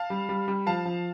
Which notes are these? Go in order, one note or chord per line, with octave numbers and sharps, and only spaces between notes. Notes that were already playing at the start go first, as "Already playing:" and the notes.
Already playing: F5 A5
G3
G3
G3
F3 F5 A5
F3